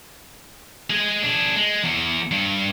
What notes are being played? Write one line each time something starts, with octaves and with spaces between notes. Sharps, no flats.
G#3 G#4
D4 G#4
G#3
E2
G2